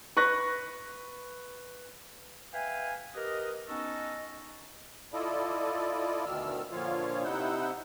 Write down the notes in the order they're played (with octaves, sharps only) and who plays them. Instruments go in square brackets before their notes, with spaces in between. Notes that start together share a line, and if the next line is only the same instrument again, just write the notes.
[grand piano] B4 C#6 F#6 A#6
[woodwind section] B4 E5 F5 G5 G#5
G4 A#4 B4 D#5
B3 C#4 D#4 F#4 A4 D#5
[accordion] E4 F4 A4 D5 D#5
D2 B2 D#3 E6 F6
A#2 D3 F3 F4 C#5 F5
C3 D#4 E4 F#5 E6 G6